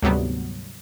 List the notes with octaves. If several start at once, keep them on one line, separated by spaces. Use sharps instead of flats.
D2 G#2 C3 F#3 G3 B3